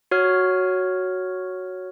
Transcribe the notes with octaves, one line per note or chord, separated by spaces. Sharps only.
F#4 C#5 F6